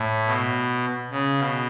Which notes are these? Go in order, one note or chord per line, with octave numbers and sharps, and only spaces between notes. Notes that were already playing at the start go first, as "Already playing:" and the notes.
Already playing: A2
B2
C#3
B2